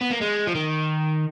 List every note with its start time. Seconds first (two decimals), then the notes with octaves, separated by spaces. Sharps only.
0.01 B3
0.11 A#3
0.21 G#3
0.47 F3
0.55 D#3